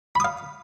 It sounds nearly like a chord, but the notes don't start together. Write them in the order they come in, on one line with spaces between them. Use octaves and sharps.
B5 D#6 F5